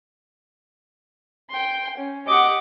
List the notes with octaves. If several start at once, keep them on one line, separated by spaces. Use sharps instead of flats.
G5 C6
C#4
G4 D#5 F#5 D6